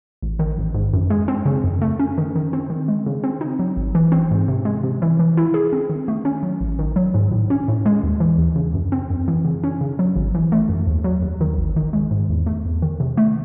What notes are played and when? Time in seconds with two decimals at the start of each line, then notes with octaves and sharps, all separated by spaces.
0.22 A1
0.39 D#3
0.58 A1
0.75 G#2
0.94 F#2
1.10 G#3
1.28 C4
1.46 C#3
1.64 F#2
1.82 A3
1.99 C#4
2.18 D#3
2.36 D#3
2.53 C4
2.70 D#3
2.88 G#3
3.06 C#3
3.24 C4
3.41 D#4
3.59 F#3
3.76 G#1
3.95 E3
4.12 C4
4.31 G#2
4.48 C3
4.65 G#3
4.83 C3
5.02 E3
5.19 E3
5.37 E4
5.54 G#4
5.73 C4
5.89 D#3
6.08 A3
6.25 C#4
6.43 F#3
6.60 A1
6.79 D#3
6.96 F#3
7.14 G#2
7.32 A2
7.50 C#4
7.68 A2
7.86 G#3
8.03 D#2
8.20 E3
8.38 D#2
8.56 C#3
8.74 F#2
8.92 C4
9.10 F#2
9.28 E3
9.45 C#3
9.64 C#4
9.81 C#3
9.99 F#3
10.16 G#1
10.35 E3
10.52 A3
10.69 F#2
10.87 D#2
11.04 F#3
11.22 D#2
11.41 D#3
11.58 G#1
11.76 D#3
11.93 G#3
12.11 G#2
12.29 E2
12.46 A3
12.65 E2
12.82 D#3
13.00 C3
13.17 A3